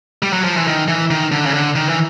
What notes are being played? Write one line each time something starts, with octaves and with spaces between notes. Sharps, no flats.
G3
F#3
F3
E3
D#3
E3
D#3
D3
C#3
D3
D#3
E3